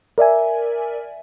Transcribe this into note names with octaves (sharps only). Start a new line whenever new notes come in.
A#4 D5 E5 G#5